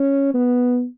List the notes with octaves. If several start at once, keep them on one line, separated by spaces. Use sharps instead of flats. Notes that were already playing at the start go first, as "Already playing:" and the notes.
Already playing: C#4
B3